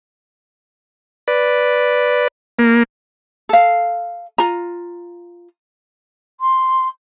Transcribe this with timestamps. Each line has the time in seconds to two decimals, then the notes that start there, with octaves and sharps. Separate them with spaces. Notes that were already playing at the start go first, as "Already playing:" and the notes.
1.28 B4 D5
2.59 A#3
3.49 A4 F5
4.38 F4 A#5
6.40 C6